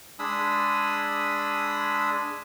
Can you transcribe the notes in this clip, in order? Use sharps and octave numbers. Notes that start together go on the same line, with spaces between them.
G#3 D4 G#5 B5 D#6 E6